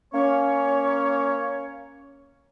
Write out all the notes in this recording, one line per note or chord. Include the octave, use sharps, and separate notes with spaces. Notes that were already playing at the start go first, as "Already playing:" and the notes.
A#3 C#4 C#5